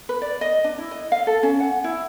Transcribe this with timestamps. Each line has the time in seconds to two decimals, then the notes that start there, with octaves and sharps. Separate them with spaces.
0.09 B4
0.22 D5
0.41 D#5
0.64 D4
0.78 E4
0.91 D#5
1.12 F5
1.27 A4
1.43 C#4
1.60 F#5
1.84 E4